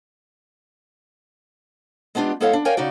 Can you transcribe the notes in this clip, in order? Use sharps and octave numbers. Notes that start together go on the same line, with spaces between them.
G#3 B3 D4 F4 G4
G#3 B3 E4 A4 C#5 F5
D4
A#4 C#5 D5 F5 G5 G#5
C#3 D#4 F#4 D5